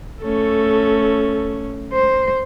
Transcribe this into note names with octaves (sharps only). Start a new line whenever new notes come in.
A3 C#4 A4
C5